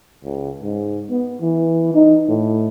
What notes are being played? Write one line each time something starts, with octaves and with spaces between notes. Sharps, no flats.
C#2
G#2
B3
E3
D#4
A2